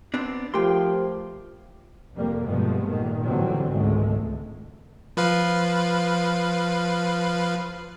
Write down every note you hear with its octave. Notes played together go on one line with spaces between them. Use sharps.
B3 C4 D4
F3 A3 G4 A#4 G5 C6
F1 F2 G3 A#3
G2 B2 F3 G#3 A3 B3
A#2 D#3
A2 D3 E3 F#3 G3 C4
G#1 C#2 C#3 G#3 A3
F3 B4 F5